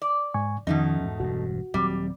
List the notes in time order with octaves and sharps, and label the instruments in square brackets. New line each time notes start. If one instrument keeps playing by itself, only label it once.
[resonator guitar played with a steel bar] D5
[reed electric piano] G#2 G#5 C#6
[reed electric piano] F2 D#3 [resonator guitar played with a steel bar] B2 A3 D#4 [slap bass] F3 C#4
[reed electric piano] E2 G#2
[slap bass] E1 G2 [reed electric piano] F#4
[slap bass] D#1 F#3 C4 [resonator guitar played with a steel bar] G3